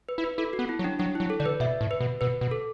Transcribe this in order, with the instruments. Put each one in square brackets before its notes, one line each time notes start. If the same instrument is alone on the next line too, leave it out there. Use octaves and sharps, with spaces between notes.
[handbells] B4
[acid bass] E4
[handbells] B4
[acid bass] E4 [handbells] A4
[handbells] F#4
[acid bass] B3
[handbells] E4
[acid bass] F#3
[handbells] D4
[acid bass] F#3 [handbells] D4
[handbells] E4
[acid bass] F#3
[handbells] A4
[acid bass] D3 [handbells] D5
[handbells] B4
[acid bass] B2 [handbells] E5
[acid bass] A2
[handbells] B4
[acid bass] B2
[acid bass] B2 [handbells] B4
[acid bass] B2
[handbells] A4